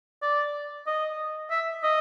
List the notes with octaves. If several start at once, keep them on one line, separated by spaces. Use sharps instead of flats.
D5
D#5
E5
D#5